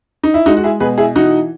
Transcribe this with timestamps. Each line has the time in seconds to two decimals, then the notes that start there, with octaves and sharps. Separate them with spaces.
0.24 D#4
0.34 E4
0.46 G#3 D#4 F#4
0.57 F#4
0.64 E4 G#4
0.80 B2 G#4 B4
0.98 E4 G#4
1.16 E3 D#4 F#4